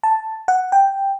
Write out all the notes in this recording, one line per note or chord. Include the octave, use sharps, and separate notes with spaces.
A5
F#5
G5